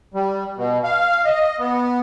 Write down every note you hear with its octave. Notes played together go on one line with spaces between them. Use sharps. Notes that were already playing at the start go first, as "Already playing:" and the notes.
G3
B2
F5
D#5
B3